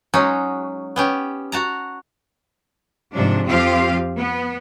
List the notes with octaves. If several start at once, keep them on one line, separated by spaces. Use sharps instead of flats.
F#3 G#3 C#4 D#4 F#4
B3 C#4 G4
F#4 A5 A#5
G#2 C3 F3 D4
F2 F3 C4 F4 G4 F5
B3